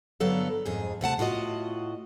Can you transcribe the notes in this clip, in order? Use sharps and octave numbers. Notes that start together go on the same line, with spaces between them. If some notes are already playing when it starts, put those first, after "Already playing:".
G2 D3 F#3 B3 A4 F5
F2 G#2 G#4
C3 A3 F#5 A5
A2 F4 F#4 D#5